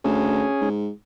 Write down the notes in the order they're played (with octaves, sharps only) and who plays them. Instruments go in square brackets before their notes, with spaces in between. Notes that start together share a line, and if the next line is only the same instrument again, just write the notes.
[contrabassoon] D2 [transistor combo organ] C#4 G#4
[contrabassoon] G#2